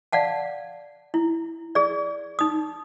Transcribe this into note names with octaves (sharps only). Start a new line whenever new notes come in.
D5 F5 F#5 A5
E4
G#4 D5
D#4 D#6